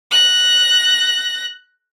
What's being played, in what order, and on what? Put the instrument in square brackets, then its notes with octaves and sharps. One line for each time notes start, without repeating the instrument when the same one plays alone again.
[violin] F#6 A#6